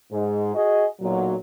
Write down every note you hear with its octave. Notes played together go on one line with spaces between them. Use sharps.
G#2
F#4 G#4 D#5
B1 A#2 F#3